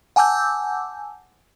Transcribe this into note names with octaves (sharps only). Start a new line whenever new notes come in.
F#5 G#5 A5 D6 E6 G6